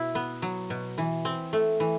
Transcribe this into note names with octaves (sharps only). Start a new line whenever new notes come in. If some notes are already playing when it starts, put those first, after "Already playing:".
Already playing: B2 E4
B3
F#3
B2
E3
C4
A3
E3